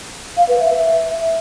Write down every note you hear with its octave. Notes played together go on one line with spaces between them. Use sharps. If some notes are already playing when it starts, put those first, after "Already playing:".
F5
B4
E5